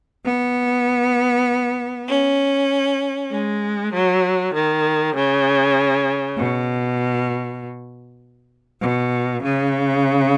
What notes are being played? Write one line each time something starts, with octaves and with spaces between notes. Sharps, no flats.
B3
C#4
G#3
F#3
D#3
C#3
B2
B2
C#3